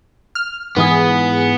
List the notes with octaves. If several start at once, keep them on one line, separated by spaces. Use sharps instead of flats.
F6
G#2 E3 B3 G#4